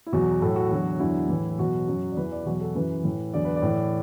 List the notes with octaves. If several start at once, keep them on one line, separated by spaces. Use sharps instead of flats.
E4
E2 B2 F#3 F#4
A2 F#3 A4
F#4
E2 D3 F#3
E2 D3 F#3 E4
A2 E3
E4
E2 B2 F#3 F#4
F#2 F#3
D5
E2 E3 B4
D5
E2 B2 F#3 F#4
A4
F#2 E3 B4
A2 E3
E2 D3 F#3 D5
B4
D5
A2 E3